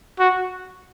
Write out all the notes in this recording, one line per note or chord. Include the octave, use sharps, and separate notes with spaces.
F#4